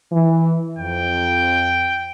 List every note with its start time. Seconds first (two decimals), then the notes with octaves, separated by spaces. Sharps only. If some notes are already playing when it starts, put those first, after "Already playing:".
0.12 E3
0.78 F2 G5